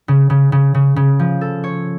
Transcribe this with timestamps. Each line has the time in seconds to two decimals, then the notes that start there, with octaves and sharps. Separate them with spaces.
0.08 C#3
0.30 C#3
0.52 C#3
0.74 C#3
0.96 C#3
1.19 F3
1.41 A4
1.64 C#5